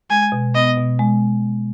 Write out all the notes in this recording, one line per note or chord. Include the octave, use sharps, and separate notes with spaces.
G#3 G#5
B2
B3 D#5
B2
G#3